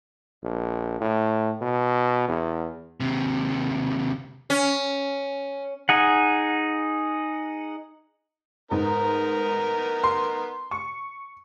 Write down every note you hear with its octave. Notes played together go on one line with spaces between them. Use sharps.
A#1
A2
B2
E2
D#2 C3
C#4
D#4 G#4 F#5
G#2 B3 D#4 A#4
C6
C#6